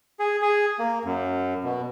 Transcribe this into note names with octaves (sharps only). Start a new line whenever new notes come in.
G#4
G#4
A#3
F#2
B2